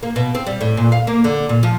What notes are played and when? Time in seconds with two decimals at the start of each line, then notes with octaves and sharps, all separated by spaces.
0.03 A#3
0.16 B2
0.35 C4
0.47 G3
0.61 A2
0.77 A#2
0.92 F5
1.07 A#3
1.24 D3
1.49 A#2
1.63 F3